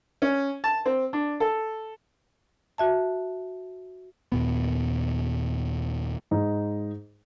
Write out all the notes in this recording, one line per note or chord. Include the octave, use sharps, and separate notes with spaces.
C#4
A5
C4
D4
A4
F#4 E5 A5
D#2 A#2 B3
G#2 D#4